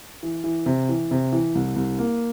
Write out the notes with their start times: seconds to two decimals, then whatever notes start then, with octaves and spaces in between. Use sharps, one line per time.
0.23 E3
0.44 E3
0.66 C3
0.89 E3
1.11 C3
1.32 E3
1.55 C2
1.76 C2
1.98 A#3